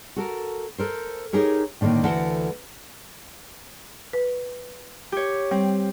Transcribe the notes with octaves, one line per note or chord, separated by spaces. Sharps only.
F#4 A4 A#4
A4 A#4 C5
D#4 G4 G#4 A#4 C#5
A2 D3 D#3 A#3
D2 E3 A4 F#5
B4
G4 C#5
G3 C4